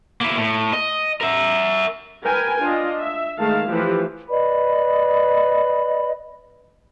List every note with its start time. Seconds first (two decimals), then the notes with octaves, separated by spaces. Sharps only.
0.21 A#3 E4
0.37 A2
0.73 D#5
1.21 A#4 E5
2.25 A#4 B4 G5 G#5
2.62 D4 F4 D#5
2.99 E5
3.38 D#3 G#3 A3 F5 A5
3.70 E3 F3 A3 E4 G4 B4
4.29 B4 D5 D#5 B5